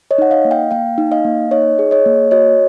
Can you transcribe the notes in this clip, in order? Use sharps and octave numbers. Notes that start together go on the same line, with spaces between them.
C#5 D#5
D#4 F#5
D#5 F5
A#3
F5 G5
A#3 F5 G5
D#4
D#5 F5
A#3
D#4 C#5 D#5
G#4
C#5 D#5
A#3
F#4 C#5 D#5